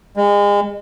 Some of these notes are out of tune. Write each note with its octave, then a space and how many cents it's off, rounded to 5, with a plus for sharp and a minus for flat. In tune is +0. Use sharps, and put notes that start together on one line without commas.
G#3 -35